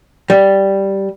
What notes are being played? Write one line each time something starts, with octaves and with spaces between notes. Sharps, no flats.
G3